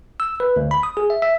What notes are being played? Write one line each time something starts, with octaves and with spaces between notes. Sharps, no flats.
E6
B4
D2
B5
D#6
G#4
E5
E5